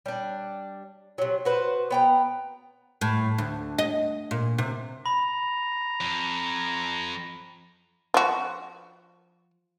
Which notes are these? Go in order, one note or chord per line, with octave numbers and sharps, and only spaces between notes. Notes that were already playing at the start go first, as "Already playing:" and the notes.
G3 D4
C3 F#3
F#4 B4 C5
B3 G5 A#5
A2
D2
D#5
A#2
C3
A#5 B5
F2
F3 F#4